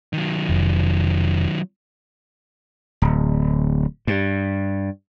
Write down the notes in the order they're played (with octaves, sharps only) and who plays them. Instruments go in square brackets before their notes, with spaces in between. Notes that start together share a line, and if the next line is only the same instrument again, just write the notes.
[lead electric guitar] D#3 F#3
[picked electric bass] F1
[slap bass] D1
G2